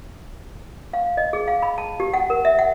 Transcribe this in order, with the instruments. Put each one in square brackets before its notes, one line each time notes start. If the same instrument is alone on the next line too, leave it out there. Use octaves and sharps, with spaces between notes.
[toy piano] F5
D#5
G#4
F5
B5
A5
G4
F#5
A#4
E5
F#5